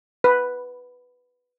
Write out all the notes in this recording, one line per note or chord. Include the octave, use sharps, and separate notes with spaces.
B4